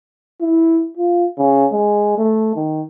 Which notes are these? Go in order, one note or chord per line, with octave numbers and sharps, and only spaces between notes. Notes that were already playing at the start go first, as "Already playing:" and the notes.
E4
F4
C#3
G#3
A3
D#3